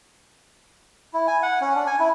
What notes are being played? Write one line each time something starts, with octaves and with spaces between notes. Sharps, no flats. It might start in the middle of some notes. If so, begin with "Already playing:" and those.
E4
G#5
F#5
C#4
D4
G#5
E4